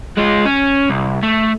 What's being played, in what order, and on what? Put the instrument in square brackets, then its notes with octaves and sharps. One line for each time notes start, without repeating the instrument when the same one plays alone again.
[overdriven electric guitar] G#3 F4
C#4
C2
A3